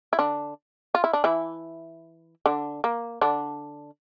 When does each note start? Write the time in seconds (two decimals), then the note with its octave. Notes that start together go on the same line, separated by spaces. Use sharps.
0.13 E4
0.19 D3 D4
0.95 F4
1.04 E4
1.13 D4
1.24 E3 E4
2.46 D3 D4
2.84 A#3
3.21 D3 D4